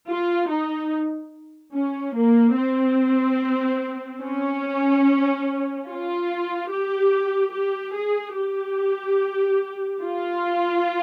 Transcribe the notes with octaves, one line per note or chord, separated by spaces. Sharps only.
F4
D#4
C#4
A#3
C4
C#4
F4
G4
G4
G#4
G4
F4